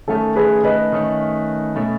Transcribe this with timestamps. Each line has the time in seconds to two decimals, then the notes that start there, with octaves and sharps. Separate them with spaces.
0.08 D#3 A3 C#4 A4
0.36 G#4 B4
0.64 B4 D#5
0.92 D#3 A3 C#4
1.76 B2 A3 C#4